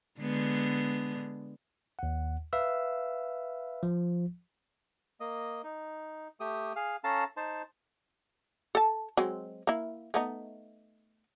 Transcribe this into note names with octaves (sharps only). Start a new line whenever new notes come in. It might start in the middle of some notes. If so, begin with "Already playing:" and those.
D3 G#3 B3
D#2 F#5
B4 E5 F5 E6
F3
A#3 D#5
D#4
A3 G4 D#6
G#4 F5
C#4 A4 F5 A5 A#5
D#4 C5 A5
A4 A5
F#3 G#3 C4
A#3 E4
A3 B3 D#4